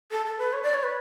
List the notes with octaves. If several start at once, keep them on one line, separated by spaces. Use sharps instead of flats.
A4
A4
B4
C#5
D5
C#5
B4